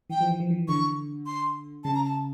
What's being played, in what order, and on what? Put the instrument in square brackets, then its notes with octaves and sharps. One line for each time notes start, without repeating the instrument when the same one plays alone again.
[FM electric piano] E3 [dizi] G5
[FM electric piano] F3
E3
F3
E3
[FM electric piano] D3 [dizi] C#6
[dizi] C6
[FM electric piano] C#3 [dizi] A5
[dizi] A#5
A5